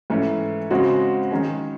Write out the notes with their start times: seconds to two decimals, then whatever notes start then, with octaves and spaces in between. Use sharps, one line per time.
0.10 G#2 E3 A3 C#4
0.71 C#3 G#3 C4 F#4
1.31 D#3 G#3 C#4